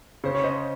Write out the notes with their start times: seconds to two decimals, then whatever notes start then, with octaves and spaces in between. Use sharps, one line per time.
0.24 C#3 C5
0.35 C#5
0.44 C5 D#5